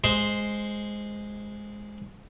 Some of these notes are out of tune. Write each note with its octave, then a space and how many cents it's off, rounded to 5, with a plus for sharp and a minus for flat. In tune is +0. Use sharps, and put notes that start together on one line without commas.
G#3 +0 C5 +0